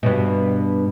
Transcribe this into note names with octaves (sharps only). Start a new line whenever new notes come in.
G2 B2